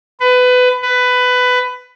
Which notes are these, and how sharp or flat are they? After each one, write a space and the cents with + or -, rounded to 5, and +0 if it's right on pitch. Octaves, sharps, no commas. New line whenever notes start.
B4 +20
B4 +15